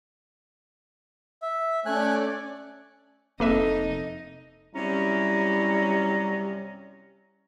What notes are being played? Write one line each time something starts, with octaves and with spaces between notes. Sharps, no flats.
E5
A3 C#4 D5 G#5 F#6
F1 A#3 C4 D#4 A4 B4 D#5 E5
F#2 C3 G3 C#4 E4 A#5